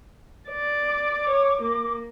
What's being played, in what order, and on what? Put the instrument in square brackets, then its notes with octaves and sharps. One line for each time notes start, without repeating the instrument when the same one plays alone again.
[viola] D5
[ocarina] D6
[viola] C#5
A#3